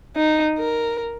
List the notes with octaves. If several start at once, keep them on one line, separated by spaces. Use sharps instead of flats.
D#4
A#4